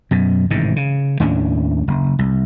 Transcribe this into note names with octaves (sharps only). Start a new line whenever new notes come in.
F#2 B2
A1 G#2 C3 D#3
C#3
D#2 A2 C#4 D4
F#1
C2